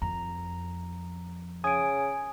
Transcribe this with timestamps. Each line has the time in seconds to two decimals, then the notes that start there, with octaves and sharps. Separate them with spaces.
0.02 F2 A#5
1.64 C#3 G#5 D#6 D7